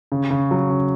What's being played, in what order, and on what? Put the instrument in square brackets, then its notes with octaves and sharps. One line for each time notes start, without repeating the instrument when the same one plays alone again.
[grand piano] C#3
C#3
F#3
C#3